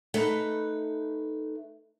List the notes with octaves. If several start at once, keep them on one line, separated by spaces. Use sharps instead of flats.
A3 D#4 B4